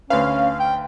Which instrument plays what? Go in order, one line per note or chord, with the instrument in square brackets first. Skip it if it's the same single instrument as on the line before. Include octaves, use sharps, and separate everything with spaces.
[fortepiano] D2 B4 [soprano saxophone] C#4 [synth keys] F5
[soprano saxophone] G5